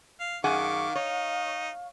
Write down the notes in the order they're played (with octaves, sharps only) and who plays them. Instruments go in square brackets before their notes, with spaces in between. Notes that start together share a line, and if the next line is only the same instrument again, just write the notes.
[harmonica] F5
[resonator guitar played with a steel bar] F#2 G#4 F#5 [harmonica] D#3 C#6 D6 [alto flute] F5
[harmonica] D#4 [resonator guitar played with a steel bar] C#5